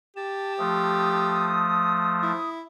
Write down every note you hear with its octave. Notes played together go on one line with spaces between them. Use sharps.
G4 A5
F3 A3 D#6
E4